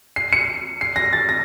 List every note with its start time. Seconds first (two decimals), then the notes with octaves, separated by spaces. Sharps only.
0.16 C7
0.33 C#7
0.81 C7
0.96 A#6
1.13 A6
1.29 A#6